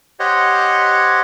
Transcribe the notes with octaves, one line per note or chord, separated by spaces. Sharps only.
G4 C5 C#5 D#5 F#5